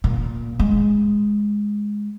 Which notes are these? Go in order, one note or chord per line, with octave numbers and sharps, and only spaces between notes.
A#2
G#3